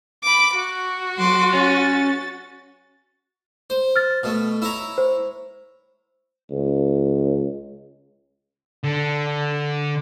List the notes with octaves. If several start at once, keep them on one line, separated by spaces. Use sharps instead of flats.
B5 D6
F#4
F#3 C6 D6
C#4 A6
C5
F6 A6
B2 A3
E4 C#5 A#5
C5
C#2
D3